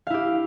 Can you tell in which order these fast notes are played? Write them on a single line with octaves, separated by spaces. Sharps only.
F5 E4 G4